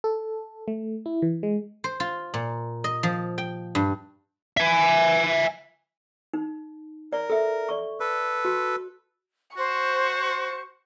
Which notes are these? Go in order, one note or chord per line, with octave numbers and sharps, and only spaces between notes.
A4
A3
E4
E3
G#3
C5
F4
A#2
D#5
F3
G5
G2
E5 G#5
D#4
A#4 D5
A4 E5
D5 C#6
A4 B4
F#4
F#4 C5 C#6